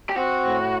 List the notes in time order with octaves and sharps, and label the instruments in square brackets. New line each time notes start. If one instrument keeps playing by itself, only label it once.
[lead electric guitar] G4
[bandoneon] C4 [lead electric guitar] F#4
[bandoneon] A2